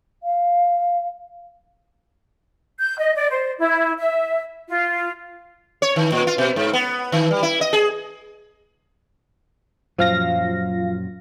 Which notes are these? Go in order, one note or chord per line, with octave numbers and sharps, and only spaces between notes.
F5
G6
D#5
D5
C5
E4
E5
F4
C#5
D#3
A#2
F4
B2
G#2
B3
D#3
G3
E4
D#5
G#4
F#2 A#2 F3 F#3 F5 A#6